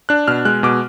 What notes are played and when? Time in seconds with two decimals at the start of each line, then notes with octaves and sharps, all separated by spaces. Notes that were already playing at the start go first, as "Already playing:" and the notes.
0.09 D4 F#6
0.28 B2 F6
0.45 G#3 F#6
0.63 B2 D6